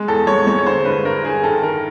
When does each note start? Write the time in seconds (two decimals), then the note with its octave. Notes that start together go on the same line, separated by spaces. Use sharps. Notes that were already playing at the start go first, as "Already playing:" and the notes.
Already playing: G#3
0.08 E2 A4
0.27 G#3 C#5
0.47 G#3 C#5
0.58 C#5
0.66 D3 C5
0.85 G2 B4
1.05 G2 A#4
1.25 G2 G#4
1.43 D#3 A4
1.63 D#3 A#4